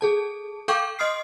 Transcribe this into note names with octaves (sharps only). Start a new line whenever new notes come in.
G#4 A4 A5
A4 F5 G5 C#6 D6 G6
D#5 C6 D#6 F6 C7